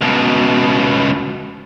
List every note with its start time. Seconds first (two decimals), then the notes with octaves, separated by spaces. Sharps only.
0.01 C#2 B2